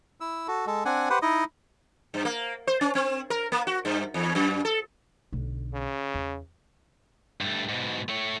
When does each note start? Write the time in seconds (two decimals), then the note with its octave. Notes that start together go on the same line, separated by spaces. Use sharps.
0.21 E4 E6
0.48 F#4 A4
0.67 G#3 A4
0.85 C4 D4 F#5 G#5
1.10 G4 B4 C5 F#5
1.22 D#4 E4 D#5
2.14 G2
2.25 A#3
2.67 C5
2.81 C#4
2.95 C4
3.30 A#4
3.52 A#3
3.67 F#4
3.85 G2
4.14 E2
4.35 F#2
4.65 A4
5.33 B1 D3
5.74 C#3
6.14 E2
7.41 G2 A3
7.69 G#2 B2
8.09 A3 C#5